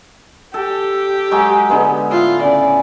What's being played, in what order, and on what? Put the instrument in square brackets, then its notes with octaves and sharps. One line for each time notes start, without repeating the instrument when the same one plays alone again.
[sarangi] G4 [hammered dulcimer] A4
[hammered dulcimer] F#3 G#3
D3 G#3 B3
[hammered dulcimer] A2 [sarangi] F4
[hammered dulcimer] C#3 [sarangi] D5